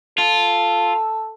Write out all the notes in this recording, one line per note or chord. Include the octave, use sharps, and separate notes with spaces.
F4 A4